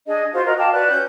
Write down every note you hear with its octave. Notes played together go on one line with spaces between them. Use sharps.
D4 G#4 D#5
F4 F#4 C5 F5
F#4 A#4 D#5
F5 G5 A5 D6
F#4 B4 D5 F#6
C#4 G6